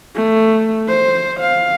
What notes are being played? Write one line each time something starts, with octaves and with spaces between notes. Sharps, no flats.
A3
C5
F5